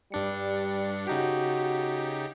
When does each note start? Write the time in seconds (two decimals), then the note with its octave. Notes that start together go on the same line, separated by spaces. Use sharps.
0.12 G2 G3 D4 C#7
1.08 C#3 D#4 F#4 G4